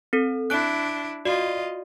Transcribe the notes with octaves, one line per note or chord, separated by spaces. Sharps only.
C4 A4
D4 E4 F#6 D7
F4 F#4 D5 D#5